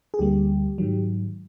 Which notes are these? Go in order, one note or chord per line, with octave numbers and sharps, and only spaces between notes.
G#4
D2 D3 G3 A#3 G4
G#2 D#3 F#3